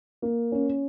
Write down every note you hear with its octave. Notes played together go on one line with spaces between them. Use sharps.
A#3
C#4